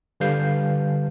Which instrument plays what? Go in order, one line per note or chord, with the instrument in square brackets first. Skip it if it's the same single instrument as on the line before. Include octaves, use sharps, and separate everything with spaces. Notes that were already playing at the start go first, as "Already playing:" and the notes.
[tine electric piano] D3 G3 B4 F5 G6 C7